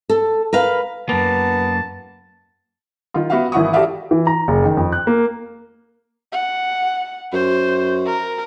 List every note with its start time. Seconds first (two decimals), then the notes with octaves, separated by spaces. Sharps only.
0.09 A4
0.53 A#4 B4 F5
1.09 F#2 A#3 B3 A5
3.14 D#3 F4
3.30 B3 F#4 E5 F5
3.52 G#1 E3 E4 F#5 C#6 D#6
3.73 F#4 G4 A4 D5 E5 F5
4.11 E3
4.27 A#5
4.48 F#1
4.64 D#3
4.77 F2
4.93 F#6
5.07 A#3
6.32 F#5
7.33 F#2 C5
8.07 A#4